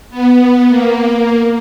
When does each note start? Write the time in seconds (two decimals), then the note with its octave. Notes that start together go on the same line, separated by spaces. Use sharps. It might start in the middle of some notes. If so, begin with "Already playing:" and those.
0.10 B3
0.69 A#3